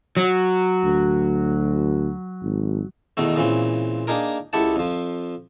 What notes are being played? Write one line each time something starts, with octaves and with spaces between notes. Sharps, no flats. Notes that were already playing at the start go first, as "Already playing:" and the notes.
F#3
D2
G#1
E2 B2 D#3 A3
A#2 C#3 E3 C4
A#3 D4 D#4 G#4 A#4
C#2 E4 G4 A4 F#5 A5
F2 F3